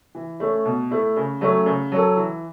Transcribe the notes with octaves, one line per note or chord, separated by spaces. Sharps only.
E3
A3 C#4
B2
A3 E4
C#3
F#3 A3 C#4
C#3
F#3 C#4 A4
E3